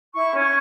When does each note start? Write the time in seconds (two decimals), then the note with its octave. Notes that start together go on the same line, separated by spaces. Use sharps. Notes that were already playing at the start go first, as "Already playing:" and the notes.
0.14 E4 C#6
0.34 C#4
0.41 C#6